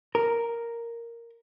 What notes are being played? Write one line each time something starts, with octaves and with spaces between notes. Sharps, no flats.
A#4